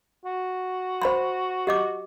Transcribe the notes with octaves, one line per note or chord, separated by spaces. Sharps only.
F#4
C5 B5 C6
G4 D#5 D6